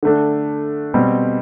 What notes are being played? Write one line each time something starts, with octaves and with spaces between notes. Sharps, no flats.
D3 A3 D4
B2 G3 C4